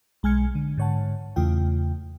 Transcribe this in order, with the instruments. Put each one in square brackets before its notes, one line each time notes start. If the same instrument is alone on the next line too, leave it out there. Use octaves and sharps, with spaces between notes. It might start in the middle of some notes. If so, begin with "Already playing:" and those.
[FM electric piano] B1 G#3 G#5 F6 G#6 C#7
D3
G#2 D3 C#5 F#5 A5
E2 C#3 A3 F4 G5